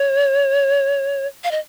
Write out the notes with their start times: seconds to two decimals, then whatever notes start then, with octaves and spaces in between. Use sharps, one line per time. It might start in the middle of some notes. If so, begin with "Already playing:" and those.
Already playing: C#5
1.44 F5
1.51 D#5